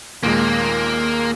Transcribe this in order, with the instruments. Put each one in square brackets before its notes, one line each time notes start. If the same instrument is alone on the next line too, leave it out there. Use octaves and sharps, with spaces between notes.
[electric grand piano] D#2 A#2 G#3 [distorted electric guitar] A#3